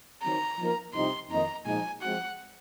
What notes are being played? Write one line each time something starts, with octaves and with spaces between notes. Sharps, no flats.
D#3 F#3 C4 A#5
F3 A#3 D#4 A#4
C2 C3 F3 C4 D#4 C6
F2 D#3 A#3 D#4 A#5
A#2 F3 G#3 D#4 G#5
F3 G#3 C4 F#4 F#5